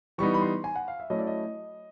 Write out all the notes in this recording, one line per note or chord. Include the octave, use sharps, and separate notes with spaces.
E3 G3 B3 D#4 C#6
B5
C6
G#5
F#5
F5
E5
F#3 A3 C#4 E4 D#5
D5
D#5